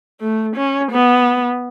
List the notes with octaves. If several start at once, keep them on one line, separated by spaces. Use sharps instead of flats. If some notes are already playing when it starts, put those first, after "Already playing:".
A3
C#4
B3